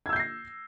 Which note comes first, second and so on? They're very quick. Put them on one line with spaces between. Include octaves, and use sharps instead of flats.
G#6 E6 G6 C7 A#6